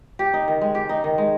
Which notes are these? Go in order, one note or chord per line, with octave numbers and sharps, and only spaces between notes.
G4
D#4
D#3
G#3
G4
D#4
D#3
G#3